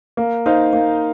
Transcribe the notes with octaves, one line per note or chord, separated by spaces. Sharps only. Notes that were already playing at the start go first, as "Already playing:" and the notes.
A#3
D#4 C5 F5
A#3